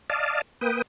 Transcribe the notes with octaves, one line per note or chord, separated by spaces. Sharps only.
D5 D#5 F5 A5
A#3 B4 G5 D#6